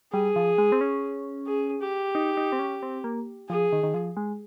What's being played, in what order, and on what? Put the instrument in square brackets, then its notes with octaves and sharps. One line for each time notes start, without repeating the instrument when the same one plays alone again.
[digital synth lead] G3 [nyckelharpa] G#4
[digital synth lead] F3
G#3
C4
C#4
[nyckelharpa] G#4
G4
[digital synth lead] D#4
D#4
C4
C#4
C4
A#3
[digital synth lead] F3 [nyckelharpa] G#4
[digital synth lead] D#3
D#3
F3
G#3